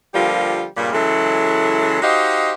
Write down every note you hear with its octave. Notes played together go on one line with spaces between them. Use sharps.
D3 F3 G3 A#3 F4 G4
G2 A#2 C#3 G3 A#3
C#3 E3 F#3 G#3 E4 A4
D#4 F#4 G4 C5 D#5 F5